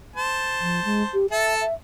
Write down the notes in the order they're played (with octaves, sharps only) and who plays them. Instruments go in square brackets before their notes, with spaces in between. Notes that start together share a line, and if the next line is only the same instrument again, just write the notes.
[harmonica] C5 A5
[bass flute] F3
G#3
G4
[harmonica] A4 A5 [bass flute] E5
[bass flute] E5